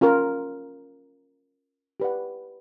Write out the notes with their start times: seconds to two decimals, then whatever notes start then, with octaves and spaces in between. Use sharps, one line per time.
0.01 C#4 F4 A#4
2.00 G4 B4 D5 F#5